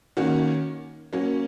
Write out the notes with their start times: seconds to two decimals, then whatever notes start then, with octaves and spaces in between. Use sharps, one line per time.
0.17 D#3 A#3 C#4 F#4
1.13 F#3 A#3 C#4